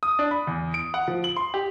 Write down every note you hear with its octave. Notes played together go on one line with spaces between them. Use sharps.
D#6
D4
B5
E2
D7
F#5
F3
F#7
C6
G4